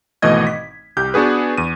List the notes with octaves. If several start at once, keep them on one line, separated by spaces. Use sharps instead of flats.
G#1 B2 E3 A3 D#5 G#6
B6
C2 G4 G6
B3 D4 F#4 G#4 B4
E2 D#7